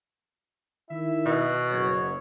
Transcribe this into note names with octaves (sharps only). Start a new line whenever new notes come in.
D#3 E4 E5
B2
F#1 F#3 C#5